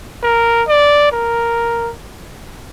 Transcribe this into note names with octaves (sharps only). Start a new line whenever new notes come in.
A#4
D5
A#4